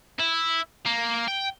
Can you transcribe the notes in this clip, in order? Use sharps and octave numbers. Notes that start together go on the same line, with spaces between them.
E4
A#3
G5